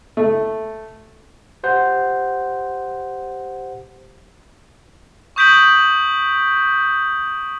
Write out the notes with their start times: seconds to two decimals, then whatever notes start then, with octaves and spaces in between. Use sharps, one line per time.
0.17 A3
1.63 G4 C5 F#5
5.36 C#6 D#6 G6 B6 D7 F#7